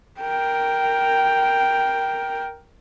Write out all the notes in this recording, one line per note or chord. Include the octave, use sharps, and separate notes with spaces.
A#4 G5